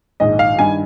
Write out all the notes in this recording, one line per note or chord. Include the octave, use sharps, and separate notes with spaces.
A#1 G#2 D#3 D#5
F5
G2 D#3 G#5